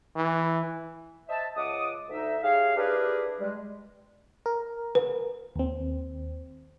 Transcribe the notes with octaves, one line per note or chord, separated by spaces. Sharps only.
E3
C5 D#5 E5 A5
C#2 D#5 F#5 D6 D#6
D2 D#4 E5
G4 G#4 C#5 F5
D4 E4 G4 G#4 A#4 B4
G3 G#3
A#4
B4
D#2 C4